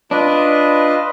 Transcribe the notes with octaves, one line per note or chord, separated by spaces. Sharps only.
D4 F4 B4 D#5